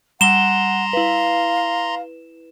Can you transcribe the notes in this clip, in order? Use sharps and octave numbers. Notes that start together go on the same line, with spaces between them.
G3 F#5 A#5 C6 E6 E7 G7
E4 B4 F5